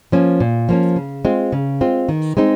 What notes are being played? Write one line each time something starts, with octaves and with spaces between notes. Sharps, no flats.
F3 A#3 C#4
A#2
F3 A#3 C#4
C#3
G#3 C4 F4
C#3
G#3 C4 F4
D#3
G#3 C4 D#4